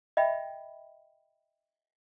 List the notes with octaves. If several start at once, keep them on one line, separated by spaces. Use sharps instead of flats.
D#5 E5 G5 B5